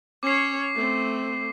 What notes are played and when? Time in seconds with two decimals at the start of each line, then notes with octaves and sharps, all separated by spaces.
0.23 C#4 C#5 D6 C7
0.75 A3 C4